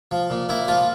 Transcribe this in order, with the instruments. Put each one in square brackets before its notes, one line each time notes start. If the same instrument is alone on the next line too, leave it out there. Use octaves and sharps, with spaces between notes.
[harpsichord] F3
A#2
A#2 E4
F3 F4